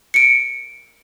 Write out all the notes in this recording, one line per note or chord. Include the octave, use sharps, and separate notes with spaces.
C#7 D7